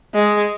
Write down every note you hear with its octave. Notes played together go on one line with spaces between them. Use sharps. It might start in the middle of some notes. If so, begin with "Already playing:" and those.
G#3